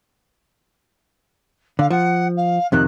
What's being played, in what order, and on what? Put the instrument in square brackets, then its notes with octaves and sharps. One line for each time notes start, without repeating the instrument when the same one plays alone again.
[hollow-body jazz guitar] D3 [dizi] F5
[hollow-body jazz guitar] F3 [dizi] F#5
[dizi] F5
[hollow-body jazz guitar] F2 C3 D#3 [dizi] F#6